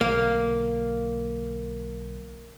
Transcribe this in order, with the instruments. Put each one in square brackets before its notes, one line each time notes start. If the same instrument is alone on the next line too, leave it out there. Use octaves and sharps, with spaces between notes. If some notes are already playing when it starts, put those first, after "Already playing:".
[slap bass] B1 D3 [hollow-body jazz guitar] A#3